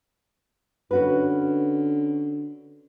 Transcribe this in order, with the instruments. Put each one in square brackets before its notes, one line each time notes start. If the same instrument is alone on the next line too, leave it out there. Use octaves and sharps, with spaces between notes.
[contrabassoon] D3 [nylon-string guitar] C#4 F#4 B4